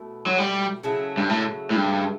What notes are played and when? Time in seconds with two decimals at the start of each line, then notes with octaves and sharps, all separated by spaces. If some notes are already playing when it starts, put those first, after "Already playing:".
Already playing: B2 A3 E4
0.26 F#3
0.38 G3
0.83 C#3 F#3 A3 E4
1.18 G2
1.29 A2
1.70 A2
1.76 G2